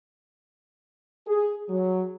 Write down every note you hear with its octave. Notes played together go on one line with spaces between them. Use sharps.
G#4
F#3